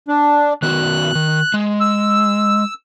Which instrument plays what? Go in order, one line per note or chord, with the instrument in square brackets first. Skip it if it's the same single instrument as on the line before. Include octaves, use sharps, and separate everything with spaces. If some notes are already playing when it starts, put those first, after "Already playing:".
[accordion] D4
[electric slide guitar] D#3 B3 F#4 [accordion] F#6
[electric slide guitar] D#3
G#3
[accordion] E6